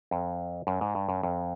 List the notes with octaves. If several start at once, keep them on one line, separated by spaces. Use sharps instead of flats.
F2
F#2
G#2
G2
F#2
F2